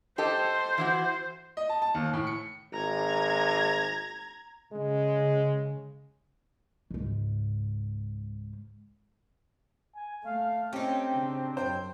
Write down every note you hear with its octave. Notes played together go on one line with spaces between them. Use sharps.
G4 A4 C5 D#5
E3 E4 F#4
D#5
A5
A5
D#2
A2
C#7
G#1 A#5 G#6
C#3 G#3
C#2 G#2
G#5
A3 F5
C4 C#4 D#4 G4
C#3 D4
F#2 C5 G5